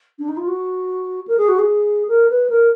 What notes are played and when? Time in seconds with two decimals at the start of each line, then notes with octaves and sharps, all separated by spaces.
0.19 D4
0.28 D#4
0.37 F4
0.47 F#4
1.27 A#4
1.37 G#4
1.48 F#4
1.58 G#4
2.08 A#4
2.29 B4
2.49 A#4